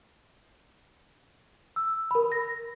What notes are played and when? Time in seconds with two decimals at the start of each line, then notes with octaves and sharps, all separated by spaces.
1.76 E6
2.11 A#4 B5
2.32 A#6